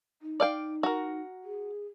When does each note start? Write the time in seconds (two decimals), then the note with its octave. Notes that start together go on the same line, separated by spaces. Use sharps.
0.22 D#4
0.40 D5 F5 G5
0.83 F#4 A#4
1.44 G#4